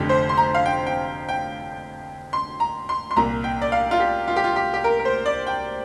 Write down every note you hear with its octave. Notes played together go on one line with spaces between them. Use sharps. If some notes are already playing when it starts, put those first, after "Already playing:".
Already playing: F1 F2 D3 G4
C5
C6
A#5
F5
G5
G5
G5
C6
A#5
C6
C6
C2 A#2 A#5
G5
D5
F5
F4
G4
F4
G4
F4
G4
G4
A#4
A#4
C5
D5
G5